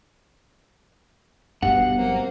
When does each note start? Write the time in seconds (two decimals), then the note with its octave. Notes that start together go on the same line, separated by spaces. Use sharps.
1.62 G1 G2 B2 F#5
1.97 F#3 A#3 C4